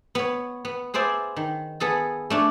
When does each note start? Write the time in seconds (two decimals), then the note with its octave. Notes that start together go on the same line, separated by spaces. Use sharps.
0.15 B3 C#5
0.65 B3
0.94 B3 G#4 C5 D5 E5
1.36 D#3
1.80 B3 G#4 A4
2.30 A3 D4 C#5